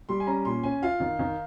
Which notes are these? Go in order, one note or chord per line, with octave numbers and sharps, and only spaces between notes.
G3 C6
G#5
C#4 A#5
A#2 C6
C#4 G#5
F4 F5
D#3
D#3